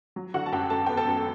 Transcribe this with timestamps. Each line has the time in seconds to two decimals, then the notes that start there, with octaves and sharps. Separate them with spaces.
0.16 F#3
0.34 D3 F#4 F#5
0.46 A5
0.52 F#2 G4 G5
0.70 F#2 A4 A5
0.86 B3 G5
0.97 A4 A5
1.06 F#2